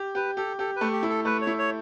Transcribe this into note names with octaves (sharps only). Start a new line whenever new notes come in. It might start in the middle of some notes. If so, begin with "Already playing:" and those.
Already playing: G4
G4 B4
G4 A4
G4 A4
A3 B4
G4
E4
A4
A3 B4
C#5
E4
C#5